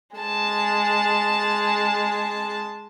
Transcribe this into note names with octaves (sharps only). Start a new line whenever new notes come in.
G#3 A5